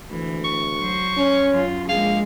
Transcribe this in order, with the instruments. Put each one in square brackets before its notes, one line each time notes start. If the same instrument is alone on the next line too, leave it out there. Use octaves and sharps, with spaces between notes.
[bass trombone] D2 [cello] E3
[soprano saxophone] C#6
[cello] F#3 C5
[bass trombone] C#4
[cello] F#2 F4
[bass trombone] A#1 [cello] G#3 G#4 [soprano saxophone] F5